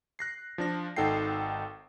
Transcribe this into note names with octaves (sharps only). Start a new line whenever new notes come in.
F#6 A#6 C7
F3 D4 A#6
G#1 D#4 A4 F#5 G5 C7